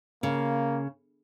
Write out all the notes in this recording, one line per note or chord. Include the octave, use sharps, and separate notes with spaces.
C#3 A#3